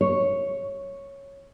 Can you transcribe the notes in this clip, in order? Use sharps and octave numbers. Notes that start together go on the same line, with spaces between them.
C#5